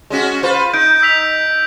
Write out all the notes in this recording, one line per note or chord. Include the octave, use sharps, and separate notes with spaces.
G#3 C#4 F#4
F4 B4 C5
D#4 G6 D7
E6 B6 F7